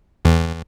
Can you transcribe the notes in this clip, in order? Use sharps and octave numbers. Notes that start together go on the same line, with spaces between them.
E2